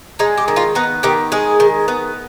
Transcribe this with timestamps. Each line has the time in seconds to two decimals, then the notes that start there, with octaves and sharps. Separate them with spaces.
0.19 G#3 D#4
0.37 G4
0.48 D#3
0.56 F4
0.75 B3 D#4
1.03 D#3 G4
1.32 G#3 G#4
1.60 D#3
1.88 B3